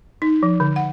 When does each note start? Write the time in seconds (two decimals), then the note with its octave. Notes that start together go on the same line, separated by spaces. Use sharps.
0.22 D#4
0.43 F3
0.60 D3
0.76 F#5